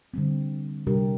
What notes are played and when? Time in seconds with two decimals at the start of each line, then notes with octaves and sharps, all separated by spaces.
0.14 D3 G3 C4
0.87 C3 G3 D4 G4 A#4